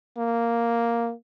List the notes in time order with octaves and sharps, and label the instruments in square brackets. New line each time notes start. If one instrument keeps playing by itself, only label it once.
[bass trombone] A#3